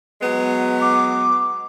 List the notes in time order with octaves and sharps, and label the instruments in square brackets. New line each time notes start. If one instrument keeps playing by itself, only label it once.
[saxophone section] F#3 G#3 B3
[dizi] D6